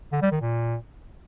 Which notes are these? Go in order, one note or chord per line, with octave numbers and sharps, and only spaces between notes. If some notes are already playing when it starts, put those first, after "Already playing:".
D3
G3
D#3
A#2